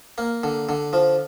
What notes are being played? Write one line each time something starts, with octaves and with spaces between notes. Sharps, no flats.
A#3
D3
D3
F3